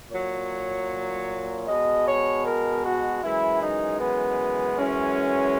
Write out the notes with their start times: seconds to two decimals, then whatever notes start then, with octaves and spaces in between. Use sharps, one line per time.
0.10 A#2 F#3 C#5
1.66 B2 G#3 D#5
2.05 C#5
2.44 A#4
2.83 F#4
3.22 F#2 E3 G#3 E4
3.61 D#4
3.99 B3
4.77 F#2 E3 G#3 C#4